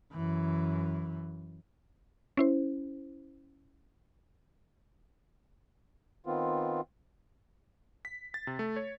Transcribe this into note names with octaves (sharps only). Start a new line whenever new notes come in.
F#2 E3
C#4 E4 C5
D#3 B3 C4 F4
B6
A6
C3
A3
C#5